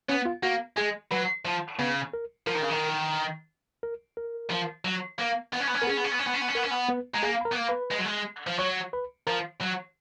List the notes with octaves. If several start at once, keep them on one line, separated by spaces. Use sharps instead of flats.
B3 C#4 C#5
F4 F5
A#3 F#4 F#5
G#3 G#4 G#5
F#3 B4 B5
F3
C#3 B3 B4
A#4
F3 A#4
D#3
C#3
D#3
A#4
A#4
F3
F#3
A#3
B3
C#4
B3
C#4
B3 A#4
C#4 G#4
B3
C#4
B3
C#4
B3
C#4
B3
C#4
B3 A#4
C#4
B3
B3 B4
G#3 A#5
A#3 G#4 G#5
B5
A#4 A#5
B3
A#3
B4 B5
G#3
F#3
G#3
F3
F#3 C#5 C#6
B4 B5
F3 A#4 A#5
F#3